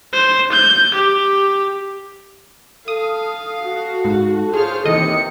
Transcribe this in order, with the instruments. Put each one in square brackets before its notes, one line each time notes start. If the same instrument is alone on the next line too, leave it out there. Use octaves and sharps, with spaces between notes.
[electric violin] C5
G6
G4
[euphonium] A4 [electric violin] F5 [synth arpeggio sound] D#6
[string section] F#4
[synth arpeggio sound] G#2
[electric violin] F4 C#5 [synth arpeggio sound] G#4 [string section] C5 F6
[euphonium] D#2 [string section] C3 [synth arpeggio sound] E3 D#5 D#6 [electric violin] C#7